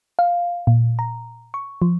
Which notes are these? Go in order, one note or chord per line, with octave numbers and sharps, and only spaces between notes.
F5
A#2
A#5
C#6
F3